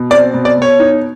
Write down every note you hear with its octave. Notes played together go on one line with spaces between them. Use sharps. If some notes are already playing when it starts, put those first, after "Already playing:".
Already playing: B2
C4 D5
B2
D5
B2 C#5
D#4